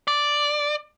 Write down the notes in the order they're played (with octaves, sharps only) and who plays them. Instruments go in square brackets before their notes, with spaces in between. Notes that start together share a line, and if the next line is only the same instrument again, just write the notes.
[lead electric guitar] D5